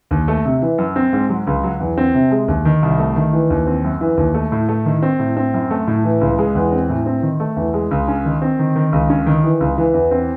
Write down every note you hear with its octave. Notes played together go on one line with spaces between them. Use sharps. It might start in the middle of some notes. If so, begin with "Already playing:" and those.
D#2
A3
C3
E3
F#2
C4
G#2
F#3
C#2
F#3
E2
C4
C3
G#3
D#2
D#3
C2
A3
D#3
E3
D#2
C4
F#2
E3
D#2
A3
A2
A3
D#3
C4
A2
C4
F#2
A3
A2
E3
C#2
G#3
E2
C4
A2
C4
D#3
A3
E2
G#3
C#2
C#4
D#3
C4
D#3
D#3
C#2
C#4
D#3
E3
C#2
E3
E2
C4